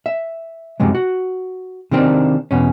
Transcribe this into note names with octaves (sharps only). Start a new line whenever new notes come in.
E5
C2 F#2 C3 F#3 G#3
F#4
C3 D#3 A#3 C4 D4
E2 B2 C#4